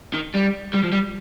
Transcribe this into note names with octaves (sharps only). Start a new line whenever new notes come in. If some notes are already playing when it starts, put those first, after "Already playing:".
D#3
G3
G3
F3
G3